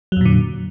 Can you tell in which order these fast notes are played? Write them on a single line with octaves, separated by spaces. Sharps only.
F#3 F2 A#2 D3